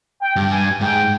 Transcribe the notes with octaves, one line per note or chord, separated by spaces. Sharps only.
G5
G2
G#5
G#2 G5